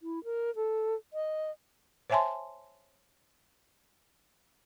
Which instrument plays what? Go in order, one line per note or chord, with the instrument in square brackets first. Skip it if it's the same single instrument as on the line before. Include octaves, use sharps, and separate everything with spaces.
[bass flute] E4
A#4
A4
D#5
[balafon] C5 C#5 E5 G#5 A5 C6